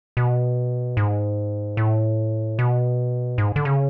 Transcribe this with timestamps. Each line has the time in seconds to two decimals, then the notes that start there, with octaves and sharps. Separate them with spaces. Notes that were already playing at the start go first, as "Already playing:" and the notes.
0.17 B2
0.97 G#2
1.77 A2
2.59 B2
3.38 G#2
3.56 D3
3.65 C#3